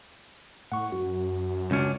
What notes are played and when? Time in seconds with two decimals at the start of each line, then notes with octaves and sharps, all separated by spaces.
0.72 A2 F#5 C#6
0.92 F#2 F#4
1.71 C#2 C#4 D4